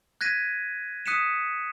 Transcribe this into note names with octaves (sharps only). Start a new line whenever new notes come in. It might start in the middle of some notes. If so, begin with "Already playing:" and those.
F#6 G#6 A#6 B6 D#7
D#6 F#6 B6 C#7 D#7 E7